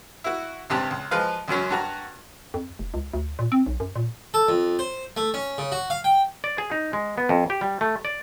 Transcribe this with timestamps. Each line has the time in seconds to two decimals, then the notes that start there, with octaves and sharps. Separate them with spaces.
0.24 E4 F#4
0.70 C#2 G2 C3 G4 A5 A#5
0.91 C#2
1.11 F3 G#3 B4 F5
1.48 C#2 F#2 F#3 C#4
1.71 G2 F#4 A#5
2.54 F2
2.79 F1
2.94 C#2
3.14 D2
3.39 A#2
3.52 C4
3.66 B1
3.80 F#2
3.96 A#2
4.34 A4
4.49 F2
4.79 C5
5.17 A3
5.34 C#4
5.58 C#3
5.72 F#4
5.90 F5
6.04 G5
6.44 D5
6.58 G#4
6.71 D#4
6.93 G#3
7.18 B3
7.29 F2
7.50 G4
7.61 G3
7.81 A3
8.05 D5